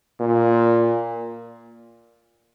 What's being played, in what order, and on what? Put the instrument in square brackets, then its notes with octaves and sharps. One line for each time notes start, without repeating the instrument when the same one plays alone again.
[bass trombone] A#2